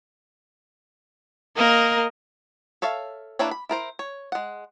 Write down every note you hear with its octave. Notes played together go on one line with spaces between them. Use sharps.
A#3 A#4 D#5
A4 C#5 E5 F5
A#3 D4 E4 B4 C#5
B5
E4 A#4 C5
C#5
G#3 F#5